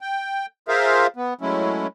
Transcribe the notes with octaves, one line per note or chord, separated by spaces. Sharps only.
G5
F4 G#4 A#4 C5 E5 F5
B3
F#3 G#3 A3 C#4 E4